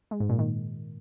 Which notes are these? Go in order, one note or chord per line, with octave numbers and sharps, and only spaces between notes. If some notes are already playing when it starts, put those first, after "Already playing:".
G#3
G#2
A#2
D#3